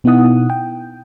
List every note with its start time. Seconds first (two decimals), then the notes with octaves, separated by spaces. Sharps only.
0.04 B2 B3 D#4 E4 F#5 D#6
0.50 G5